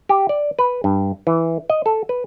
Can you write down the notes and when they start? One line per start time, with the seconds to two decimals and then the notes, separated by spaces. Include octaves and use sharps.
0.09 G4
0.29 D5
0.59 B4
0.84 G2
1.27 E3
1.70 D#5
1.86 A4
2.09 B4